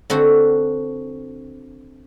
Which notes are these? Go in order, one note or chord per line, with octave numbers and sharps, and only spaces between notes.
D3 C4 F#4